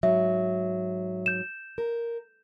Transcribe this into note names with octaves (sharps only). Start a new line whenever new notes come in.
G#2 F#3 E5
G6 E7
A#4